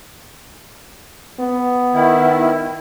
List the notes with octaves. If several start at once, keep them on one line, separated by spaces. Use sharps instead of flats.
B3
D#3 E4